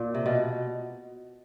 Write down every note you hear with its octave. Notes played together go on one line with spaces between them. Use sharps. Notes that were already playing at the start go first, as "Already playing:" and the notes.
Already playing: A#2
C3
B2